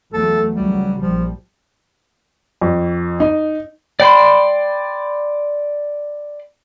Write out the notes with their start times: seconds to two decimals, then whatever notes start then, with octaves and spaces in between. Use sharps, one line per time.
0.13 E2 F#3 A3 A4
0.55 C#2 F#3 G3
1.01 A#1 F3 G3
2.61 F2
3.20 D#4
4.00 D5 G5 B5 C6